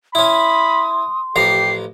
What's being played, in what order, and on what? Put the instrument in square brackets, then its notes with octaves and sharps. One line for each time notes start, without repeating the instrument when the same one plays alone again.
[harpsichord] C#4 E4 [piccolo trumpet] B5 [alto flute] C6 [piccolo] D#6
[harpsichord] A1 F3 A#5 [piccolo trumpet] G4 [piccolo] C7